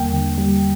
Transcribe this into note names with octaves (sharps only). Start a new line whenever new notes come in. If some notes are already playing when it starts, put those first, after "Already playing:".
Already playing: E2 D3 G3 A#3 G5
D3
G3